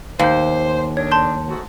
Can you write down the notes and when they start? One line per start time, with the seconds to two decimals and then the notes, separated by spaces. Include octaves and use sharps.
0.19 D#2 C5 F5 G6
0.97 D#3 A3 D4 C#5
1.11 A5 C6 G6
1.48 G#2 A3 F#4